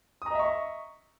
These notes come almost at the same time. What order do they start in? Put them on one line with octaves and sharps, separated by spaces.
D#6 A#5 D#5 E5 C#6